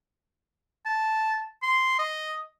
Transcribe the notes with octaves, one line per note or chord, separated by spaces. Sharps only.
A5
C6
D#5